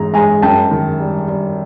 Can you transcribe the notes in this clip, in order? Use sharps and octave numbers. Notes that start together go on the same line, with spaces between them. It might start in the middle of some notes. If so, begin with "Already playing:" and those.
Already playing: G#2 E3 A#5
G#3 G#5 A#5
F#2 G5 A5
D#3
G3
G3